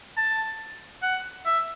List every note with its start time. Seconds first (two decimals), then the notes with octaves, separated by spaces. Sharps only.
0.17 A5
1.02 F#5
1.46 E5